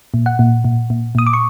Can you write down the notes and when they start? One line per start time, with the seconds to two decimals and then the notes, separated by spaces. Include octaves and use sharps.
0.14 A#2
0.26 F#5
0.39 A#2
0.64 A#2
0.90 A#2
1.15 A#2 D#6
1.27 D6
1.33 C#6